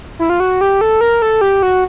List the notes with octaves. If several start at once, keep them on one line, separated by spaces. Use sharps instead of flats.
E4
F4
F#4
G4
A4
A#4
A4
G4
F#4